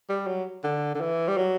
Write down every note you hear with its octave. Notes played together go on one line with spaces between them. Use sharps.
G3
F#3
D3
D3
E3
G3
F#3